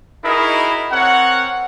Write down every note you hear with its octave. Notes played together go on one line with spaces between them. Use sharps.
D#4 E4 F#4 G#4 A#4 D#5
C4 A#4 C#5 F#5